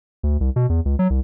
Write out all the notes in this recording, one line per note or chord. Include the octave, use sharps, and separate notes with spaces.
D2
C2
B2
E2
C#2
F#3
C2